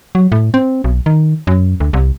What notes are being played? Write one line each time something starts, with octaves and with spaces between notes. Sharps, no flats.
F#3
A2
C4
B1
D#3
F#2
D2
C2